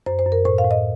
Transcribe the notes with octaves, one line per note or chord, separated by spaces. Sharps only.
F#2 C5
C5
F#2
A#4
A2 C5
F5
A2
D#5